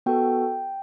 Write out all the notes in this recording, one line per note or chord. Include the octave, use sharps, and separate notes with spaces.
B3 F#4 A4 G5